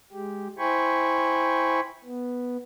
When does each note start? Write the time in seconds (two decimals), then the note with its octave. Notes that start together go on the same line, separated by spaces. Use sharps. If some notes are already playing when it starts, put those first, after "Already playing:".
0.13 G#3 G4
0.59 E4 C5 G5 G#5 B5 C#6
2.04 B3